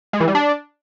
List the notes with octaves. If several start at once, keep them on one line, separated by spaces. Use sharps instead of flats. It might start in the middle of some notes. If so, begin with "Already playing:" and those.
G#3
E3
G3
D4